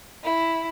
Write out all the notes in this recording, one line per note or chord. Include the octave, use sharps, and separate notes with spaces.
E4